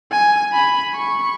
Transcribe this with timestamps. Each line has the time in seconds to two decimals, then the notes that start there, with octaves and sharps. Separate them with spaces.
0.12 G#5
0.53 B5
0.95 C#6